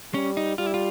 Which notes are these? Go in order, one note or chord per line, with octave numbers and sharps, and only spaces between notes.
G3 C#4
D#4
G3 F4
E4
F4